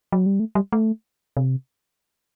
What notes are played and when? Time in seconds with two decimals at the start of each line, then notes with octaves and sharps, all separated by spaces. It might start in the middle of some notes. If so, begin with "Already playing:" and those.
0.12 F#3
0.26 G3
0.40 A3
0.55 G3
0.72 A3
1.37 C3